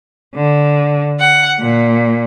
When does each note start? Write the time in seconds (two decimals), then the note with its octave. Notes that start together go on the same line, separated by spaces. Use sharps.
0.35 D3
1.20 F#5
1.61 A#2